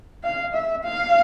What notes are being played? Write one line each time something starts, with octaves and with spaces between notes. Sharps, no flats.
F5
E5
F5